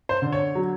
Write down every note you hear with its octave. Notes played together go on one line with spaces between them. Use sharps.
C5
D3
C#5
F#3